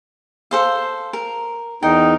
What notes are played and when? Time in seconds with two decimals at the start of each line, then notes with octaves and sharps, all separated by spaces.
0.51 A4 C5 F5
1.13 A#4
1.83 E2 D#4 A#4 G5